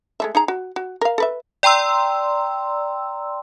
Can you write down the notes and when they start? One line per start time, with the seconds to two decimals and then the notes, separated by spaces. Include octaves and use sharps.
0.20 G#3 A3 E5
0.35 D#4 G#4 A#5
0.48 F#4
0.76 F#4
1.01 A#4 F5
1.18 A4 B4 E5
1.63 D5 G5 A#5 C6 E6